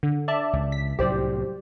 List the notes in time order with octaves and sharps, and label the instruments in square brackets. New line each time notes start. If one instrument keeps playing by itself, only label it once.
[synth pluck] D3
D5 E5 A5
[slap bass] C#2
[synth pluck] B6
[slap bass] C2 A2 F#3 [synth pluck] G4 C5 D5